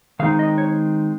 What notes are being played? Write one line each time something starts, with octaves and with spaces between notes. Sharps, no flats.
D#3 G#3 C4 D#4 F5
D#5
C#5